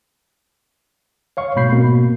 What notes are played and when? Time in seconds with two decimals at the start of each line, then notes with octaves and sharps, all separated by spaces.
1.37 C#5 F5 C#6
1.56 G#2 B2 A3 B5 G6 C7
1.72 B2 A#3 C4